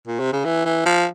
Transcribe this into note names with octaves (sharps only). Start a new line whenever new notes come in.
A#2
C3
C#3
E3
E3
F3